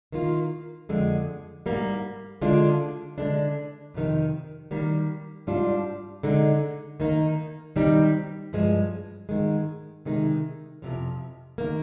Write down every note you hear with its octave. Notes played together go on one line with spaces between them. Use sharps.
D#3 A#3 F4
F2 D3 G#3
G#2 G3 A#3
D3 G#3 D4 F4
D3 G#3 D4
F2 C3 D#3
D#3 G3 A#3
G#2 G3 D4 F4
D3 G#3 D#4
D#3 A#3 D#4
D#3 G3 C4 D#4
G2 F3 G#3
G#2 D#3 G#3
C3 D#3 G#3 D#4
F2 C3 F3
D#3 A#3